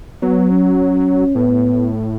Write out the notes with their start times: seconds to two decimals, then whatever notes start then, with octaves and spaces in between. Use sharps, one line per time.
0.22 F#3 B3
0.50 C#4
1.35 A2 B3